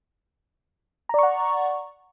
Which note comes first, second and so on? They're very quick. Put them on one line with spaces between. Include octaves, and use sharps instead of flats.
A#5 D5 C#6 F#5